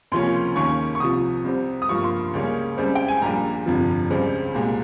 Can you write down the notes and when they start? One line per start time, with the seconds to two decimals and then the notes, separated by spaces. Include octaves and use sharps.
0.12 C#2 C3 F3 A#3 C#4 C6
0.56 D#2 D#3 A#3 C#4 C#6
0.95 C#6
1.00 C2 C3 F3 D#6
1.44 C2 C3 G3 C4
1.82 D#6
1.89 G2 F3 A#3 C#6
2.04 C6
2.33 C#2 C#3 G3 A#3 C#4
2.77 C#2 C#3 G3 C4
2.95 G5
3.08 G#5
3.22 A#1 A#2 G3 A#5
3.66 G1 F2 C3 F3
4.10 C#2 C#3 G3 C4
4.54 C2 A#2 G#3